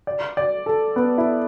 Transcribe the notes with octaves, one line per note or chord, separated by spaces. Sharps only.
D5
D5
A4
B3
E4